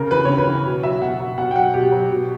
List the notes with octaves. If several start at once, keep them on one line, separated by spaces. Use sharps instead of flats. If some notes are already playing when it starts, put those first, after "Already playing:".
Already playing: C#3 A#4
E3 B4
C#3 C#5
B4
E3
B2
F#3 E5
B2 F#5
F#3
B2 F#5
G5
F#3 F#5
B2 G4
F#3
B2